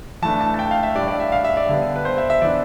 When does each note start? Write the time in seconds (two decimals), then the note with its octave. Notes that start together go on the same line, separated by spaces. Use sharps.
0.22 E3 A3 D4 A5
0.41 A5
0.54 A5
0.59 G5
0.71 F5
0.83 E5
0.95 A2 G3 D4 D5
1.08 D5
1.20 E5
1.32 F5
1.44 E5
1.57 D5
1.69 D3 G3 B3
1.96 B4
2.05 C5
2.18 E5
2.30 E5
2.42 E3 B3 D4 D5